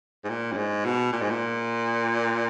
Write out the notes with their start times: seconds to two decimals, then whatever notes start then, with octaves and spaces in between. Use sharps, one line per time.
0.24 G#2
0.29 A#2
0.52 F#2
0.57 G#2
0.85 B2
1.13 A#2
1.21 G#2
1.30 A#2